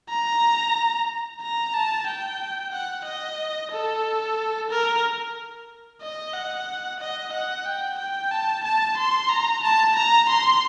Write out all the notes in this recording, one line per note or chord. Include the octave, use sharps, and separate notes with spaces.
A#5
A#5
A5
G5
F#5
D#5
A4
A#4
D#5
F#5
D#5
F#5
G5
G5
A5
A5
C6
A#5
A5
A#5
C6